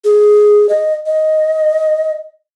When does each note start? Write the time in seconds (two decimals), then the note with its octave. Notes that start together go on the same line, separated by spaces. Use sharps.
0.05 G#4
0.69 D#5
1.06 D#5